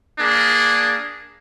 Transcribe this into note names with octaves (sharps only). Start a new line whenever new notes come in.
A#3 D4 G#4